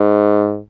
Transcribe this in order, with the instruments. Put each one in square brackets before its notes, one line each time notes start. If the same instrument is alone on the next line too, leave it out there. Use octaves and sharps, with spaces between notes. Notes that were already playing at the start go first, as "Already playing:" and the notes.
Already playing: [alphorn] G#2